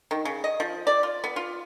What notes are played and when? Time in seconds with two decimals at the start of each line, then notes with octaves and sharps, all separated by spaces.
0.11 D#3
0.25 C#3
0.44 D#5
0.60 F3
0.87 D5
1.03 F4
1.24 B3
1.36 F4